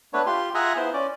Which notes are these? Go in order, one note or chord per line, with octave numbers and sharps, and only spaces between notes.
A3 B3 D4 B4 C#5
F4 G4 C6
F4 G#4 E5 F#5 G#5 A#5
B3 E4 C5
C#4 D5